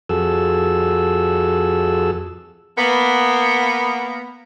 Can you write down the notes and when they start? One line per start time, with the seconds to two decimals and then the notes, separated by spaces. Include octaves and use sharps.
0.09 F2 F#4 G#4 A4 E6
2.78 A#3 B3